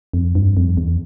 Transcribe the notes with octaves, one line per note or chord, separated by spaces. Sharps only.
F2
G2
F2
E2